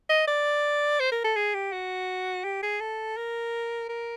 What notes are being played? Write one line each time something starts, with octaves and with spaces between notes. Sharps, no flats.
D#5
D5
C5
A#4
A4
G#4
G4
F#4
G4
G#4
A4
A#4
A#4